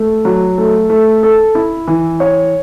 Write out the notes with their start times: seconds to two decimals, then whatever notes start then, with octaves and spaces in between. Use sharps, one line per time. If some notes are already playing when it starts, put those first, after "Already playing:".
Already playing: A3
0.25 F#3
0.58 A3
0.90 A3
1.23 A4
1.55 E4
1.88 E3
2.20 C#5